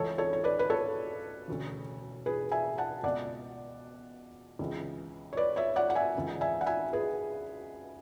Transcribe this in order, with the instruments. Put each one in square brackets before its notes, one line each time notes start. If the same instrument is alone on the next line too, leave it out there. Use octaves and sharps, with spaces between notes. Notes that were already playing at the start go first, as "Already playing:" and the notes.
Already playing: [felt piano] C#2 C#3 E3 A4 C#5
A4 C#5
C#5
B4 D5
B4
A4 C#5
E1 D2 C#3
G#4 B4
E5 G#5
F#5 A5
C#2 B2 D5 F#5
C#2 C#3 E3
C#5
B4 D5
C#5 E5
D5 F#5
F#5
E5 G#5
C#2 C#3 E3
E5 G#5
F#5
E5 G#5
G#4 B4